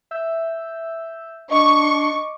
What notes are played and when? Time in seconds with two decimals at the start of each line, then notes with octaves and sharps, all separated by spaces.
0.11 E5 E6 G6
1.51 D4 D#5 C#6 D6